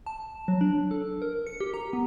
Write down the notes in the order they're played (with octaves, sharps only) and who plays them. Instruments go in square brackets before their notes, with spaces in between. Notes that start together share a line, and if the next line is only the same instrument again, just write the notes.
[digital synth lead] A5
F#3
D4
A4
A#4
C#7
G4
A#5
B3